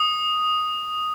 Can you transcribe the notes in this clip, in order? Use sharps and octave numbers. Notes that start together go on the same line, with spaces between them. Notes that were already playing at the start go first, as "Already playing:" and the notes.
Already playing: D#6